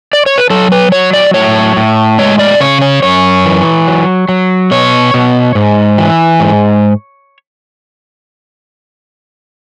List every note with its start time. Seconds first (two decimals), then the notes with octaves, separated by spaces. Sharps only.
0.13 D5
0.26 C#5
0.38 B4
0.50 F#3 A4
0.72 B4
0.92 F#3 C#5
1.13 D5
1.34 A2 C#5
1.76 A2
2.19 G#3 C#5
2.39 D5
2.60 C#3 C#5
2.81 C#5
3.02 F#2 C#5
3.45 E3
3.87 F#3
4.29 F#3
4.71 B2 C#5
5.14 B2
5.55 G#2
5.98 E3
6.40 G#2